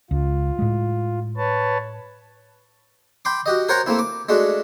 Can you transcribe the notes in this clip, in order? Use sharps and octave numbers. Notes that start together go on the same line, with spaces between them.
C#2 F4
A2 G#3
B4 C#5 A5
G5 B5 C6 D6
F#4 G4 D#5
A#4 C5 C#5 F#5 G5 A#5
A3 A#3 C4 E4
D6
G#3 A3 D4 F#4